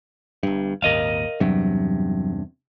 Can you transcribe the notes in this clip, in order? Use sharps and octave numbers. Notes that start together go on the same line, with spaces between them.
G1 G2
D#1 G#1 D#2 A#4 D#5 F5
E2 G2 C3 F#3